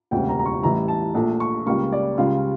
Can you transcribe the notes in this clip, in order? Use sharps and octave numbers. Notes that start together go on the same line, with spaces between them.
E1 D2 C#3 G3 A#3 G5
A#5
A#5
C#6
A1 A2 E3 G3 A#5
A5
A#1 A#2 A3
C#6
C#2 C#3 G3 A#3 C#6
D5
C#2 C#3 G3 F4